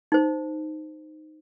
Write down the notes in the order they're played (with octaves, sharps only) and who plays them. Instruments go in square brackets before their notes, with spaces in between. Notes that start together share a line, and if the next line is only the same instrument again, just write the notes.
[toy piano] D#4 C5